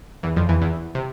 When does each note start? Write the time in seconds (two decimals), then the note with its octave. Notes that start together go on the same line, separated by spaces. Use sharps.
0.23 E2 E3
0.36 F2 F3
0.49 E2 E3
0.61 E2 E3
0.95 C3